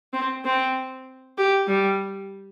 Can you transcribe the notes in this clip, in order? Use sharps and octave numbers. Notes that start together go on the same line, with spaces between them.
C4
C4
G4
G3